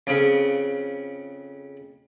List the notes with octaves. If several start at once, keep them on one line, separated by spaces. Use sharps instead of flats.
F2 C#3